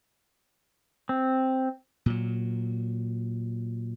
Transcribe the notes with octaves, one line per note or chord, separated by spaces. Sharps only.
C4
A#2 F#3